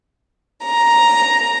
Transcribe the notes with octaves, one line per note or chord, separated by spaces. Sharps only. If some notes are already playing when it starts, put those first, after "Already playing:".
A#5